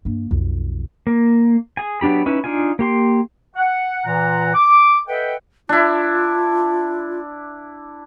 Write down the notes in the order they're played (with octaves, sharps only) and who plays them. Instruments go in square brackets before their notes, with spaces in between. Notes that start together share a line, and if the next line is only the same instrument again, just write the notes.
[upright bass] G2 A#3
B1 F2
[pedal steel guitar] A#3
G#4 G#5
F#3 B3 D4 G4 B5
C#4 D#4 E4 B4
D4 D#4 F4 G#5
A#3 G4 C6
[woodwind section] F#5
A#2 E3 F#5 A#5
D6
A4 B4 D#5 E5 F#5 G5
[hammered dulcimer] D4 E4 [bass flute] F4